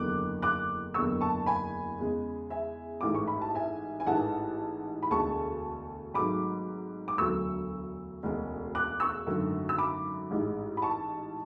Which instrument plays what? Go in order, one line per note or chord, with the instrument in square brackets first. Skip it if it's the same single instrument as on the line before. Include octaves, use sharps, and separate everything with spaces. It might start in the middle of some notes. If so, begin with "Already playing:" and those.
Already playing: [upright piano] F#1 E2 D3 D6 F#6
D6 F#6
F#1 E2 D3 C#6 E6
A5 C#6
G#5 B5
E2 C#3 G#3
E5 G#5
A1 G#2 E3 A3 D6
C#6
B5
A5
E5 G#5
G#5
A1 G#2 E3 A3 F#5 A5
B5
E1 D2 D3 G#3 A5 C#6
G#1 G#2 F#3 A3 B5 D6
D6
E1 D2 D3 F#3 A3 C#6 E6
E1 D2 C#3 G#3
D6 F#6
C#6 E6
G#1 F#2 D3 A3
E6
B5 D6
A1 G#2 G#3
B5
A5 C#6